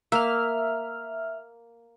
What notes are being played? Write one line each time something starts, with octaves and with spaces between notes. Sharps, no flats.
A#3 E5 F6